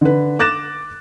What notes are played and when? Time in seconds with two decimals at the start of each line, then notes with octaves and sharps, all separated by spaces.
0.01 D3 B4
0.39 D6 F#6 A6 A#6 E7